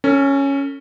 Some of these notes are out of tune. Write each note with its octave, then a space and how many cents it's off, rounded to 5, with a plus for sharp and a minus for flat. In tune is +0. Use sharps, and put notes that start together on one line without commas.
C#4 +0 A4 +45